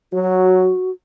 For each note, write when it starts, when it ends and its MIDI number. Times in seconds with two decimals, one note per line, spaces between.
0.13 0.70 54
0.13 0.91 66